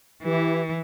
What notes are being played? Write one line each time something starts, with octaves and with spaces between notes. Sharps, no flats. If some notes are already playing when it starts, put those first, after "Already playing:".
E3 E4 G4 B4